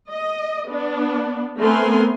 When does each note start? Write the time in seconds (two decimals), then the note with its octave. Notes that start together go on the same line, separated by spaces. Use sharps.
0.11 D#5
0.68 B3 D4
1.59 A3 B3 C4 A#4 G#5 C6